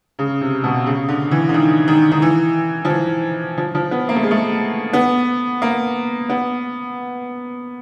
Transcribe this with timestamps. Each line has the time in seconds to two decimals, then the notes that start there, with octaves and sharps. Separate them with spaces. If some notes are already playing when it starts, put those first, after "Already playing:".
0.19 C#3
0.41 C3
0.64 B2
0.86 C#3
1.09 D3
1.31 E3
1.49 D3
1.54 D#3
1.88 D#3
2.12 D#3
2.22 E3
2.85 F3
2.90 E3
3.58 F3
3.75 F3
3.91 B3
4.09 A#3
4.16 A3
4.23 G#3
4.31 A3
4.93 B3
5.62 A#3
6.29 B3